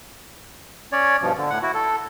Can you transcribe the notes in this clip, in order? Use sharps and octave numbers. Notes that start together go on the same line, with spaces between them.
C#4 C#5 D5
G2 B2 F3
D3
A2 F#5
E4 F#4
A4